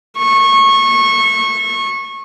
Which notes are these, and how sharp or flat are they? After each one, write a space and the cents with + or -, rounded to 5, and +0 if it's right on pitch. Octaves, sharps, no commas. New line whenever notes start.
C#6 -25